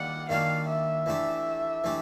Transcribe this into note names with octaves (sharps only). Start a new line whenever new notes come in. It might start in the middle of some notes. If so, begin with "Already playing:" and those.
Already playing: D#3 G3 A#3 D4 F#5
D#3 G3 A#3 D4 F#4 F5
E5
E3 A3 D4 G4
E3 A3 D4 G4